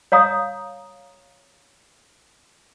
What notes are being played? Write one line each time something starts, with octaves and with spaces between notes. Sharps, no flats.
C#5 F5 A#5 D#6